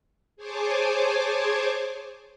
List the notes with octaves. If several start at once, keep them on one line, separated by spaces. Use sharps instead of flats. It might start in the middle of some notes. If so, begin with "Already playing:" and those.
G#4 C5 C#5 G#5 A5 D6